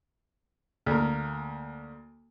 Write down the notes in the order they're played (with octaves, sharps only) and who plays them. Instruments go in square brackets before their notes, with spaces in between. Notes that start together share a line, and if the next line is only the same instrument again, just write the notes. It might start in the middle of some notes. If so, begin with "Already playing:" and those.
[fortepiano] D2 A#3